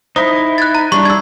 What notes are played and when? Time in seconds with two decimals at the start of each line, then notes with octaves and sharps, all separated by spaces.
0.16 D#4 E4 C5 D#6
0.58 F#6 G#6 A6
0.75 A#5
0.92 G3 D4 C#6
1.05 E6 G#6